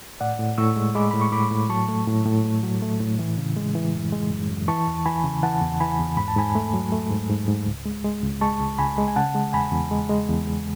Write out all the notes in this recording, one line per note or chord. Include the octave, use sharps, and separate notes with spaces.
A2 D5 F#5
A2
A2 C#6 E6
G#3
G#3 B5 D6
A2 B5
C#6
A2 B5 D6
A2
F#3 A5 C#6
A3
A2
A2
A3
F#3
A3
A2
E3
C#3
G#3
E3
F#2
G#3
F#2
F#2
E3 A5 C#6
E2
E3 G#5 B5
C#3
E3 F#5 A5
E2
E3 G#5 B5
E2
G#2 B5
A5
G#2 G#5 B5
A3
F#3
A3
G#2
G#2
G#2
C#2
G#3
G#3
C#2
G#3 A5 C#6
C#2
C#2 G#5 B5
G#3
G#5
C#3 F#5 A5
G#3
E2 G#5 B5
E2
G#3
G#3
E2
E2